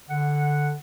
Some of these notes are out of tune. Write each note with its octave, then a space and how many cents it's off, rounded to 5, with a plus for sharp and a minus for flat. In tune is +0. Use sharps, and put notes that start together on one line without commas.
D3 +0 F#5 +0